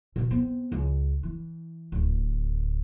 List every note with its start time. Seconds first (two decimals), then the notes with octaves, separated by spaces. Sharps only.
0.16 B2 D#3
0.31 B3 C4
0.72 C#2
1.23 E3
1.92 D1 D2